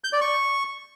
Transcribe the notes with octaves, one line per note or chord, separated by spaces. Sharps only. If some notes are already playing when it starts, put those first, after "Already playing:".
G6
D5
C#6